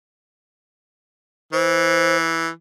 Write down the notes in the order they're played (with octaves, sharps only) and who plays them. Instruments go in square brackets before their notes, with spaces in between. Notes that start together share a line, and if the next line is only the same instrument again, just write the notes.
[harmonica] E3 [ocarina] C5